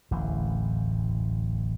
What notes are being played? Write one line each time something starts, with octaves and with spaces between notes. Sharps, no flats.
D1 A1 E2